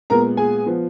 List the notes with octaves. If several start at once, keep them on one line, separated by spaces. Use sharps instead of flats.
A#2 G#3 B3 A#4 A#5
G#4 G#5
F3 B3